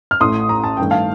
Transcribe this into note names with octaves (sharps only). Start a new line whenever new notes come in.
F6
A1 A2 A3 C6 D#6
A#5
A5
A1 G2 D#3 A3 G5
F5 A5